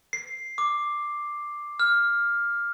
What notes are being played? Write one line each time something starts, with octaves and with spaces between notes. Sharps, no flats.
C7
D6
F6